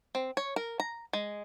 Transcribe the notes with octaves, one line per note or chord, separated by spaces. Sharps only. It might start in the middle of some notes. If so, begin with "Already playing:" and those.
C4
C#5
A#4
A#5
G#3